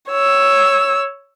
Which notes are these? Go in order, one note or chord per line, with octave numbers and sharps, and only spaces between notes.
C#5 E6